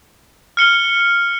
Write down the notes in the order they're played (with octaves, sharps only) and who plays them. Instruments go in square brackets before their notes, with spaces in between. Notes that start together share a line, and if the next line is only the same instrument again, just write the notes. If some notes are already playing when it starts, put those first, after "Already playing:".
[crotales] F6 C#7 G7